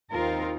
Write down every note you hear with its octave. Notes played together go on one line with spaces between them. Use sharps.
D#2 D#3 C4 D#4 F4 A#4